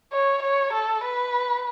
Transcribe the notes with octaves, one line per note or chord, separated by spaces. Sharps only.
C#5
C#5
A4
B4